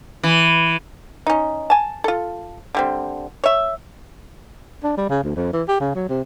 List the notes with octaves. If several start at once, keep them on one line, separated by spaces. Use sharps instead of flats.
E3
C#4 D#4
G#5 A5
F4 A4
D3 G3 C4
C#5 E5
D4
G3
C#3
D2
F2
E3
G4
C#3
F#3
C3